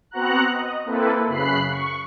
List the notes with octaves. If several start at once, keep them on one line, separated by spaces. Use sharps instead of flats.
B3 C4 F#4 F#5 A#5 F#6
D#5
A#3 C4 E4 A4 B4
F#2 C#3 B5 F#6 C7
C#6